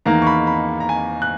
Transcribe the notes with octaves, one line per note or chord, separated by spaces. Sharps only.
E2 D#3 A#3 A#5
C#6
B5
B5
A#5
G#5
F#6